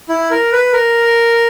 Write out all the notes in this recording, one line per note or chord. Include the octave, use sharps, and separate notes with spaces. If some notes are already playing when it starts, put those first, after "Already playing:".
E4
A#4
B4
A#4